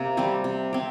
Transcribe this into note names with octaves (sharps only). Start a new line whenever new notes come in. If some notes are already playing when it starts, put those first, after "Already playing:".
Already playing: C3 A#3
G3 C4 G4
C3
C4 G4